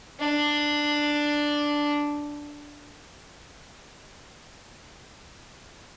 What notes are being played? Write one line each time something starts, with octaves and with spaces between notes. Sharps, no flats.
D4